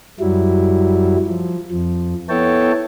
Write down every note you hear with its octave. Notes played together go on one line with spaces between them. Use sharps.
F#2 F#3 G3 E4
F3
F2 F3
B3 E4 A4 C#5 G5 A5